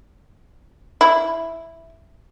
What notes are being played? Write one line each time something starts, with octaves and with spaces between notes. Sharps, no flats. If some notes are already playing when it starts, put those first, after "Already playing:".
E4